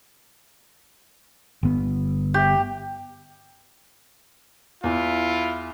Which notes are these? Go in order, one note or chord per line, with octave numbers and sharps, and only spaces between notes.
G1 B3
G4
E2 E4 F4